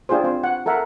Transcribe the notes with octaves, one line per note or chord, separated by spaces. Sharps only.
D4 F4 G4 G#4 C5
C4 F4 C5
F#5
A4 A#4 E5 F#5